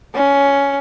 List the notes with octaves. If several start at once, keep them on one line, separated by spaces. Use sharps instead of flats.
C#4